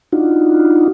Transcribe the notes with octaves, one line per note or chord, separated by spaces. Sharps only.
D4 D#4 F4 F#4